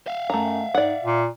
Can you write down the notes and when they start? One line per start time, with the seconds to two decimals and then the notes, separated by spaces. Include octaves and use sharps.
0.07 E5 F5
0.30 F#2 A3 A#5
0.74 G#2 D5 F#5
1.04 A#2